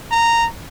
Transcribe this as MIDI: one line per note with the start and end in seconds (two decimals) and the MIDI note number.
0.11 0.47 82